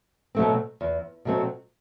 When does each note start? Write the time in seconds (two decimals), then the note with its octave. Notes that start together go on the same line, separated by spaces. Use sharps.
0.35 B2 F#3 A3 C4
0.81 E2
1.25 B2 F#3 A3 C4